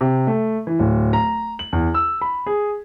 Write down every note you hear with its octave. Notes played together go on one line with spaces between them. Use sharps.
C3
A3
E3
D1
A#5
F#7
E2
E6
B5
G#4